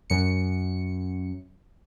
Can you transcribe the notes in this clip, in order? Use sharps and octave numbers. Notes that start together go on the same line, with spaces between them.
F#2 C#7